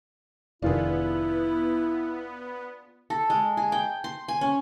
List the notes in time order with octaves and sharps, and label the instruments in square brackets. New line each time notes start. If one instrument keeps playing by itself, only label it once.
[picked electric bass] F1 D#3 [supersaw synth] B3 [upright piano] D4 F4 G#4 [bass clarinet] E4
[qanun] A4
G#3
G#4
G5
C6
G#5
C#4